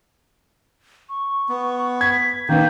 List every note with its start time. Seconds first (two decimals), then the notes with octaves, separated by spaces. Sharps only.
1.09 C#6
1.49 B3
2.01 G#6 B6
2.49 D#3 A#3 B3 G6